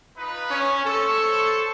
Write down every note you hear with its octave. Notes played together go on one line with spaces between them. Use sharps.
D#4 F4 B4
C#4
A4 C5 C#5 C#6